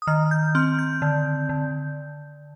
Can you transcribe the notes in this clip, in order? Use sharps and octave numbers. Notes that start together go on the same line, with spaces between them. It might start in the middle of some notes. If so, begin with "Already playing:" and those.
D#6
D#3 F6
G6
C4 F6
G6
D3
D3